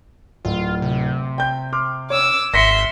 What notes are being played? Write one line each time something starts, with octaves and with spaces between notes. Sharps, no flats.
D1 F4
C3
G5 G6
C6 D6 F6
C#5 D6 E6
G#1 E5 C6 A#6 B6 C#7